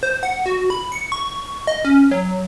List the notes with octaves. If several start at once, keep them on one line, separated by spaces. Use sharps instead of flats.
C5
F#5
F#4
B5
C#7
C#6
D#5
C#4
F#3